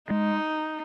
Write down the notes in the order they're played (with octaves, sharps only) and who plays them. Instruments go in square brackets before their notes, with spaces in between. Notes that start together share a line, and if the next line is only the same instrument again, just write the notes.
[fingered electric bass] G#3 [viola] D#4